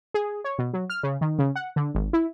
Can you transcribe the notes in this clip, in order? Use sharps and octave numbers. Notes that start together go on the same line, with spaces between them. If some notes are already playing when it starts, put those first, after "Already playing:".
G#4
C#5
B2
F#3
F6
C#3
D#3
C#3
F#5
D3
G#1
E4